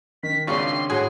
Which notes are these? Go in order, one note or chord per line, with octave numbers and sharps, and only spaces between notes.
D#3 B6
G#1 C#3 C4 D4 F4 C6 C#6
A2 F#4 G#4 C6